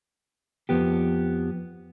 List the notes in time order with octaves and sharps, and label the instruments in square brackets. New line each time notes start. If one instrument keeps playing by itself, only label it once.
[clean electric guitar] F2 F3 B3 G4